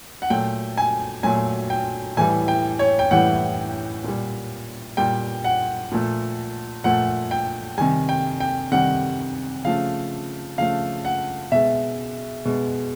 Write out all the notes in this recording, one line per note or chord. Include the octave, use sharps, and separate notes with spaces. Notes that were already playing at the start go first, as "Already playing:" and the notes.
F#5
A#2 F#3 A3 G5
G#5
A#2 F#3 A3 G#5
G5
A2 E3 G3 G#5
G5
C#5
G5
A2 E3 G3 F#5
A#2 G3
A#2 G3 G5
F#5
A#2 F3 A3
A#2 F3 A3 F#5
G5
C3 D#3 G3 G#5
G5
G5
C3 D#3 G3 F#5
C#3 F3 A3 F5
C#3 F3 A3 F5
F#5
B2 G#3 E5
B2 G#3